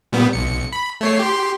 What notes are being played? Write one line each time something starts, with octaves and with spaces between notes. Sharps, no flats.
A#2 G3 B3
B1 C#7
B5
A3 C#5 C7
G4 C6